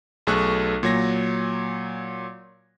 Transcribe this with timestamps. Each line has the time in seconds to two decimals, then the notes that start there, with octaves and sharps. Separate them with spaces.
0.27 B1 A3 G#4 A4 C#6 F#6
0.83 A#2 F#3 C#5 G#6 A#6